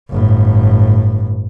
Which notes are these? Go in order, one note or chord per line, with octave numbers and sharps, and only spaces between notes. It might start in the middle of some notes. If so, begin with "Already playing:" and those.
G1 A2